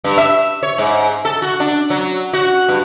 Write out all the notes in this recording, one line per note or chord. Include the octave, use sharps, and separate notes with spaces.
G2
E5
C#5
G#2
A4
F#4
D4
F#3
F#4
G2